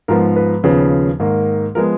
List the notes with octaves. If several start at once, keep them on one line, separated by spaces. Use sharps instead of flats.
G#2 F3 B3 A#4
B4
D#2 C#3 F3 B3
G#2 D#3 A#3
F3 G#3 B3 A#4